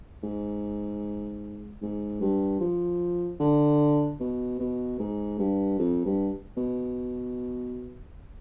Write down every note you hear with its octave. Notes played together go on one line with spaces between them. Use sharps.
G#2
G#2
G2
F3
D3
B2
B2
G#2
G2
F2
G2
B2